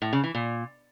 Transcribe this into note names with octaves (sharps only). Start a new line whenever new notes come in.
A2
C#3
E3
A#2